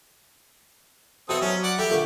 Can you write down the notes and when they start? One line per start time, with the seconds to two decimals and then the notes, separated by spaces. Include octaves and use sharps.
1.29 B2 C4 E4 A4 D#6
1.42 F#3 C#4
1.63 D5 F#5
1.78 E4 G4 A4
1.90 A#2 D3 C#6